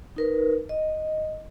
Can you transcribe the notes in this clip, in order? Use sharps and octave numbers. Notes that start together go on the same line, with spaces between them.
D#4 A#4 B4
D#5